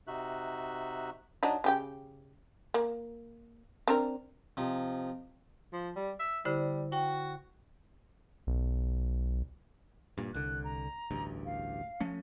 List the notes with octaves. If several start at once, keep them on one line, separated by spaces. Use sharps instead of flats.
C3 D#4 F#4 E5 F#6
F#3 D4 D#4
C#3 G4 G5
A#3
C4 D4 A#4
C3 F3 D#4
F3
G3
E5
D3 G3 E4 C5
F#4 G5
B1
G2 A#2
C2 D3 F#6
A#5
A1 D2 G2
F5
F3 A3 C#4